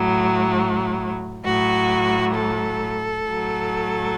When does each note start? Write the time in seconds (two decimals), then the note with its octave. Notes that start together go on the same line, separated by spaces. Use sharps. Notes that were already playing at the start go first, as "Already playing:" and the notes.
Already playing: A2 F#3
1.44 A2 F#3 F#4
2.33 A4
3.24 A2 F#3